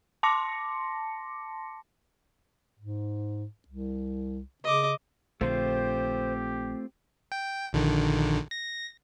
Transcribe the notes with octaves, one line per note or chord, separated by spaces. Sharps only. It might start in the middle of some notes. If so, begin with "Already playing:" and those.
A5 C6 D6 A#6 C#7
G#2
C2
C#3 D#5 D6
A#1 D3 A3 C4 F4 G4 C5
G5
A#1 D3 D#3
A#6